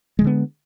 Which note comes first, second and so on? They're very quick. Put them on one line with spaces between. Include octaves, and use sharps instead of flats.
G#3 E3 D3 B3